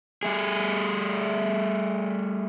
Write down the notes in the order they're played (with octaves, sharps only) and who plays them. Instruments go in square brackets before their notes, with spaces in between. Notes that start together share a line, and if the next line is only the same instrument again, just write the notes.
[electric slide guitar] G3 A3 G#4